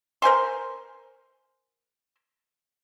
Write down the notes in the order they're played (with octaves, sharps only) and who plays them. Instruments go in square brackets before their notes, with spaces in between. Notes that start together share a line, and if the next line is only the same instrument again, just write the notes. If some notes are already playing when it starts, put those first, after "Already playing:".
[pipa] A#4 C5 G#5 C6